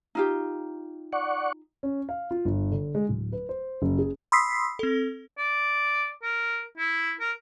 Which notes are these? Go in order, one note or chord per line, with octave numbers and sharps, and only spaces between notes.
D#4 F4 G4
D5 F#5 C#6
C#4
F5
F4
G1
D3
G#3
D1
B4
C5
F#1
G#4
B5 C6 D#6 E6 B6 C7
C4 A4
D5
A#4
E4
A#4